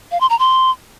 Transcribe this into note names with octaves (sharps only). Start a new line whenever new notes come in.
F5
C6
A#5
C6